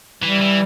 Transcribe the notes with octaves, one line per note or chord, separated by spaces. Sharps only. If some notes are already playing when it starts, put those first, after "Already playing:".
E3 G3
E3